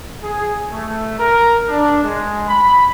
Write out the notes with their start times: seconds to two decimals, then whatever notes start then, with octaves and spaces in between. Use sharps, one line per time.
0.23 G#4
0.71 A3
1.18 A#4
1.68 D4
2.03 G#3
2.47 B5